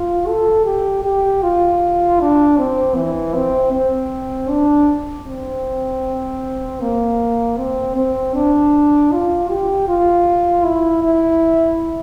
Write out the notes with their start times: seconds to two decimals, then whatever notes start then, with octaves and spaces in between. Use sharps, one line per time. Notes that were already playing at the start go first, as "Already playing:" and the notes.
Already playing: F4
0.27 A4
0.65 G4
1.04 G4
1.43 F4
2.20 D4
2.57 C4
2.96 E3
3.35 C4
3.73 C4
4.49 D4
5.26 C4
6.80 A#3
7.58 C4
7.96 C4
8.35 D4
9.12 F4
9.49 G4
9.88 F4
10.64 E4
11.03 E4